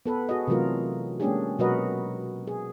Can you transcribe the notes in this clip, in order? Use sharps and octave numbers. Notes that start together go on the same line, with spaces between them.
B3 A4 B4
F#4 G#4 D#5
C3 E3 F#3 A3 F4 A#4
G#3 A#3 C#4 D4 G4 G#4
B2 F#3 F#4 A#4 B4 D#5
G#4